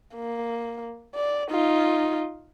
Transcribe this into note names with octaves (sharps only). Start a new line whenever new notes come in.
A#3
D5
D#4 F4